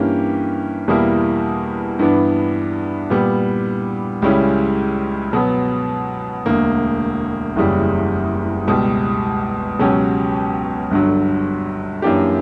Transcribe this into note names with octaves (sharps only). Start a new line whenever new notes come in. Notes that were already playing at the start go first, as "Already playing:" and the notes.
Already playing: G2 E3 A#3 C#4 G4
E2 B2 G3 A#3 E4
G2 E3 B3 D4
A#2 G3 B3
C#2 C#3 G3 C#4 E4
B2 F#3 B3
E1 D2 D3 A#3
F#1 E2 C#3 G3
C#2 B2 G3
C#2 B2 F#3 C#4 G4
G1 G2 D3 F#3
F#2 E3 A#3 D4 G4